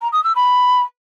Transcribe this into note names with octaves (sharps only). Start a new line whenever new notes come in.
A#5
D#6
E6
B5